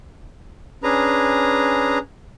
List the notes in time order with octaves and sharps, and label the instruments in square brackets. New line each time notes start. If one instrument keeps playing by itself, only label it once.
[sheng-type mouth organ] C#4 D4 G#4 B4 A#5